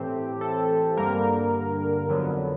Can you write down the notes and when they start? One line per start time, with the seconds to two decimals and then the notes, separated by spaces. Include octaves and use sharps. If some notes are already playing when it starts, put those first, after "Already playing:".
Already playing: A2 E3 A3 C4 G4
0.41 A4
0.97 G2 D3 G3 A#3 A#4
2.08 F2 D3 F#3 B3